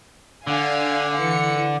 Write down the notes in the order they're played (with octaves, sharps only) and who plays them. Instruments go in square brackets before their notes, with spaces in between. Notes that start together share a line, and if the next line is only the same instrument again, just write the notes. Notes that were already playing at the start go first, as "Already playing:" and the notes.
[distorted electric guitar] D3 [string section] D4 F5 G#5
[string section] E3 C#7